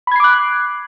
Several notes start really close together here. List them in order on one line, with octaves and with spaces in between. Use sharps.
B5 G#6 C7 D6 F#6